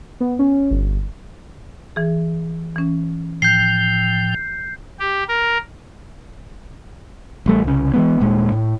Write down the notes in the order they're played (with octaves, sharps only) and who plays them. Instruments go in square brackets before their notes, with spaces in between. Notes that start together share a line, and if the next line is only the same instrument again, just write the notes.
[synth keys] B3
C#4
G1
[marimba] E3 G#4
E3 C#4
[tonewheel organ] A2 F3 G5 [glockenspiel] G6 C7
[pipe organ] G4
A#4
[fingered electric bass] A1 G3 A3
C2 C#3
E3 G#3 B3
D#1 A#2 G#3
A2